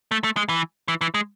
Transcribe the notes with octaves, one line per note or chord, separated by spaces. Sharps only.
A3
A3
G#3
E3
E3
E3
G#3